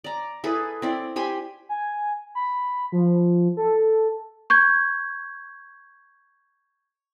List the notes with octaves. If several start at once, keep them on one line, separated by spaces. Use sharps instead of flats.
D5 A#5
E4 G#4 A4 B4
C4 E4 D5
G4 C5 G#5 B5
G#5
B5
F3
A4
C#6 G6 G#6